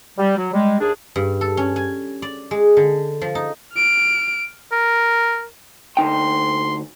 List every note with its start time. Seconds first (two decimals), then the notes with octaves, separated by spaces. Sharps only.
0.18 G3
0.37 F#3
0.53 G3 G#3
0.80 D#2 D4 G#4
1.16 G2
1.41 A4
1.57 C#4
1.76 G#5
2.22 D5
2.51 G#3
2.77 D3
3.21 F3
3.35 D#4
3.74 F6 D7
4.72 A#4
5.97 D2 D#4 G5 C6